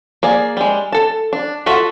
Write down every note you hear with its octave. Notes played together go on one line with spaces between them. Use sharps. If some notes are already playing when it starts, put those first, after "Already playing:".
A#3 G#4 D5
G3 G#3
A4 A5
D4
F4 F#4 A4 E5